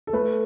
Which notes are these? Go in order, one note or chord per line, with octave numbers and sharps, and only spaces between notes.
A4
A3 B4